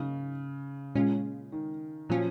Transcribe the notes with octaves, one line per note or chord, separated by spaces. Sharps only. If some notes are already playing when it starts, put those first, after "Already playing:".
Already playing: G#2 C#3 F#3 A#3 D#4
A#2 G#3 C#4 F4
D#3
A#2 F3 F#3 C#4 F4